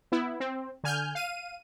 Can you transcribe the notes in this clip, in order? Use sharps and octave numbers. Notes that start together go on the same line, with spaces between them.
B3 E4
C4
D3 G#5 F6 G6
F5 D#7